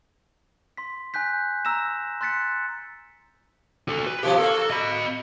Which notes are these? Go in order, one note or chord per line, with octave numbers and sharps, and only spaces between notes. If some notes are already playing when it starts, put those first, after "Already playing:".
C6 B6
G#5 F#6 G6 B6
A#5 E6 A#6 E7
C6 F#6 A6 B6 C#7
F#4 A4
B4
B2 D#3 F3 G4
A#3 F#4 A4
D#5 B5